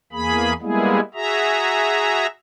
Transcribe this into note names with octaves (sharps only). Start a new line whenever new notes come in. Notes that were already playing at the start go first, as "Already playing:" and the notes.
E2 A#3 G#4 B5
G3 G#3 A#3 B3 E4 G#4
F#4 G#4 E5 A#5